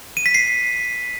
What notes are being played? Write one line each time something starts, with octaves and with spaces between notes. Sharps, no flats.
D#7
B6
C7